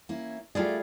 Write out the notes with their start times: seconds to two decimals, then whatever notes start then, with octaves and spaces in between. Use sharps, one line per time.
0.09 A#3 C#4 E4
0.55 G3 A3 E4 F4 G#4 D5